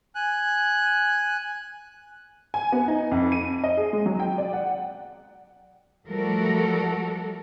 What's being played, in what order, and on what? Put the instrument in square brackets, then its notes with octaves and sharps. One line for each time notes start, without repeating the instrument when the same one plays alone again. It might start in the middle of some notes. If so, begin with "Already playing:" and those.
[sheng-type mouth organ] G#5 F#6
[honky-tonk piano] G#5
B3
D#4
F2
D#7
D#5
G#4
G#3
F#3
G5
D5
F#5
[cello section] F3 G3 A3 F#4 A4 A#4